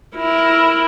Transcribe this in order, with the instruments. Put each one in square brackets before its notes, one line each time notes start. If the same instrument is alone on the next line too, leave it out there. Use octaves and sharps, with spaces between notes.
[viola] E4 A#4